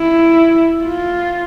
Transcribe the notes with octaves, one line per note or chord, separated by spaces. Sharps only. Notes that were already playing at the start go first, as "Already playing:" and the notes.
Already playing: E4
F4